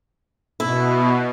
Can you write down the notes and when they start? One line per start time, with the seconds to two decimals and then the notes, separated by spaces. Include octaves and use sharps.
0.60 B2 E4